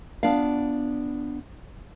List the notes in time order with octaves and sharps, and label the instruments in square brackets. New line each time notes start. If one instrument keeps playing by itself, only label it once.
[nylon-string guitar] B3 D4 F4 D5 F5